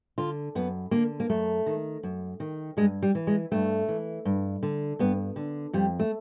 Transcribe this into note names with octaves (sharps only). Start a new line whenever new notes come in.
D3 F4
F#2 B3
D3 A#3
A#3
F#2 A3
D#3
F#2
D#3
G2 G#3
G3
E3
G#3
G2 A3
E3
G2
D3
G2 B3
D3
F2 G3
A3